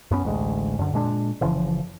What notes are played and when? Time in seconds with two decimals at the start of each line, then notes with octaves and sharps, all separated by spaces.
0.11 F#2 B3 C#4
0.23 A1 D2 G#3
0.79 F#2 D3
0.93 A#2 G#3 D4
1.41 F#1 C#3 E3 F3